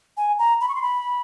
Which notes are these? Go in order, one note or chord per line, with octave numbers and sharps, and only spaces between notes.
G#5
A#5
B5
C#6
C6
B5